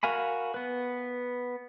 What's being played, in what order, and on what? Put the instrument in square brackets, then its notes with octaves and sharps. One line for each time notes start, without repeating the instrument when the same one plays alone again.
[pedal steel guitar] F#4 A#4 F5 G#5 B5
B3 B4